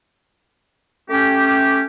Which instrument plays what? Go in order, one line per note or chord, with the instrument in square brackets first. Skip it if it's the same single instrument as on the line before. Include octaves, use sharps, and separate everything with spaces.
[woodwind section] A3 C#4 G4